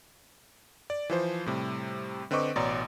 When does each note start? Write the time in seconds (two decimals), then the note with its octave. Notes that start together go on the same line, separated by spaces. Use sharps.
0.90 D5
1.10 E3 F3 C5
1.46 A2 C3 G3
2.31 D3 C4 B4 D#5 C#6 D6
2.56 A1 B2 C#5 D5 A#5 C6